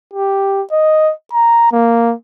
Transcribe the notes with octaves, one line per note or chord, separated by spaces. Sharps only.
G4
D#5
A#5
A#3